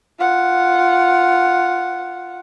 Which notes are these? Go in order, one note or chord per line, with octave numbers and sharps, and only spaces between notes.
F4 F#5